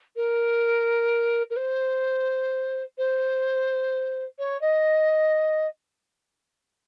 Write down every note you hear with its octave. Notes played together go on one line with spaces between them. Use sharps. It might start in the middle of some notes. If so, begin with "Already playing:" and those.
A#4
A#4
C5
C5
C#5
D#5